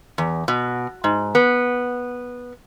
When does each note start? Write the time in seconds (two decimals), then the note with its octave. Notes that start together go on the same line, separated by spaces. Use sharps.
0.18 E2
0.48 B2
1.04 G#2
1.35 B3